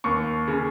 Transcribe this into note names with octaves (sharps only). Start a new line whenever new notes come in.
D#2 C#6
C#3